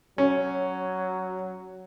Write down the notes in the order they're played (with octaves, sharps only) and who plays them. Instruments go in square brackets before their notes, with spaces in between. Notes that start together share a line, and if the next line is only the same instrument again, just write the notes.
[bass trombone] F#3 [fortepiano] C#4